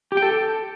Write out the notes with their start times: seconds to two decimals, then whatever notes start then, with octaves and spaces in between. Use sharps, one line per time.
0.12 G4
0.17 G5
0.22 A4